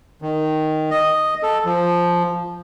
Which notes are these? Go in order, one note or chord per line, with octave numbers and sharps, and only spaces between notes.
D#3
D#5
A4
F3